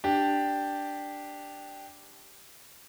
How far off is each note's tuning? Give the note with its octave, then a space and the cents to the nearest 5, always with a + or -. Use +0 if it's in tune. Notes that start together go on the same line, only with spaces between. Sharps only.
D4 +0 G4 +0